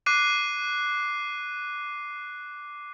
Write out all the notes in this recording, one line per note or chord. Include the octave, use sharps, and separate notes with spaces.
D6 F#6 C7 D#7